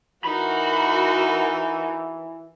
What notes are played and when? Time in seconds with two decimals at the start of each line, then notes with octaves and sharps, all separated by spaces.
0.24 E3 D#4 F#4 A#4 B5